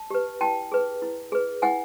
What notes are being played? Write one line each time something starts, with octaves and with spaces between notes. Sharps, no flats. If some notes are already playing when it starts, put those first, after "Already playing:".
Already playing: A5
G4 B4
E4 G5 A5
G#4 B4
E4
G#4 B4
E4 F#5 G#5